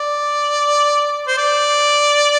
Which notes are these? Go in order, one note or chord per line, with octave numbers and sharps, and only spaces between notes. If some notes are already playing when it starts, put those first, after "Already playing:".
Already playing: D5
C5
D5